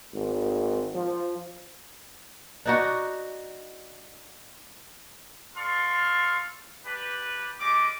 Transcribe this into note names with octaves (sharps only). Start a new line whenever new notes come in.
G#1
F3
D4 D#4 F#4
A4 D5 F5 C6 C#6
D4 G4 B4
G3 G#3 D#5 D6